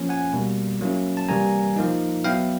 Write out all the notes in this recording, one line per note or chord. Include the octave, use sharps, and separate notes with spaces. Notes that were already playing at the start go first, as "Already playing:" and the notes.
Already playing: F3 A#3 C#4
F#5 G#5
B2 G3 A#3
F#3 A#3 C#4 E4
A5
C3 E3 G3 A#3 G#5 A#5
F3 A#3 D#4
F#3 B3 E4 F5 G5